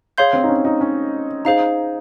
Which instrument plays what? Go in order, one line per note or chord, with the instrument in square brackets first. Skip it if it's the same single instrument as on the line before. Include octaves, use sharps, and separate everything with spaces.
[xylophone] G#4 C#5 F5 C6 G6
[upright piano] C4
D#4
C#4
D#4
C#4
[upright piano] D#4 [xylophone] G#4 C5 F5 A#5